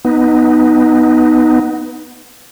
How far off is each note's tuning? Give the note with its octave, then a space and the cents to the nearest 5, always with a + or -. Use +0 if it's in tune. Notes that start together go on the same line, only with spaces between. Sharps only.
B3 +0 D#4 +0